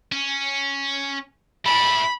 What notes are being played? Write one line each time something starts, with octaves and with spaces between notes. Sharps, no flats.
C#4
A3 E4 B5